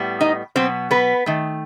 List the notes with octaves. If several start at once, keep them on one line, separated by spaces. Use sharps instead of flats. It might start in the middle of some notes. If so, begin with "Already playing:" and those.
Already playing: A2 G3 B3
D#4 D#5
B2 F#3 B3 C4 C5
B3 B4
D#3 A3